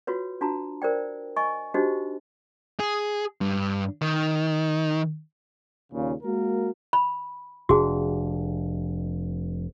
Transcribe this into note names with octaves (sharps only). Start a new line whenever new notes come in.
F4 F#4 B4 C#5
D4 F4 F#4 A5 A#5
A#4 C5 D5 G5
D#5 G#5 C#6
D4 D#4 F#4 G4 C5 D#5
G#4
G2
D#3
D#2 A#2 C#3
G#3 A#3 F#4 A#4
B5
F1 D4 F#4 G#4